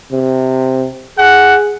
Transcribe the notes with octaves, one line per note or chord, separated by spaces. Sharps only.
C3
G#4 F#5